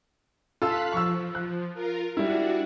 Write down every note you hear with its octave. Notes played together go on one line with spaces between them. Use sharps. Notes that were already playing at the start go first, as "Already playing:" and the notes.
F4 A4 F5 E6 F#6 B6
F3 C#6 E6
F#6
F4 A#4
G3 D4 E4 F#4